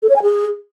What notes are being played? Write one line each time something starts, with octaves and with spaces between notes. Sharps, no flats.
A4
C#5
G#5
G#4